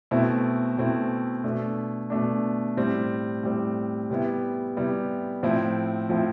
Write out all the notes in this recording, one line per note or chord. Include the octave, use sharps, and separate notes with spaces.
B2 A3 C4 E4
B2 A3 C4 E4
B2 A3 D4
B2 A3 D4
A2 G3 C4
A2 G3 C4
C3 G3 B3 E4
C3 G3 B3 E4
A2 F3 C4 E4
A2 F3 C4 E4